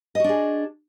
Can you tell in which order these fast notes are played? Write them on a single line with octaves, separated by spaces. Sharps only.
D#5 F#4 D4 G#4